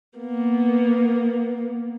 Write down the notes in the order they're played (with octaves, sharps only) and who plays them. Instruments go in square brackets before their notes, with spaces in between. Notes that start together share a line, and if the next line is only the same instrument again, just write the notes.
[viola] A#3 B3